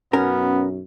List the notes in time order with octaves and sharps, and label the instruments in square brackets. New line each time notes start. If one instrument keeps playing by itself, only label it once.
[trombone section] B1 F#2 [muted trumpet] B3 [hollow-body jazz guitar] C#4 A#4